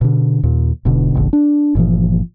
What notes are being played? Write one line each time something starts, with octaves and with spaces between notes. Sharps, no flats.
B2 D3
D#2 A#2
E1 B2 D3
F1 A#1 D3
D4
G1 A#2 E3 F3